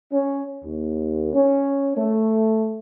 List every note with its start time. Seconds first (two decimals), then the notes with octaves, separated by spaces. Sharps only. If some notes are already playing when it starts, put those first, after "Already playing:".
0.12 C#4
0.64 D#2
1.34 C#4
1.97 A3